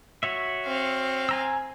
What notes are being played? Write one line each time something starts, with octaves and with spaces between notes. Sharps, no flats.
F#4 C#5 E5
C4 F5
G#5 A#5 E6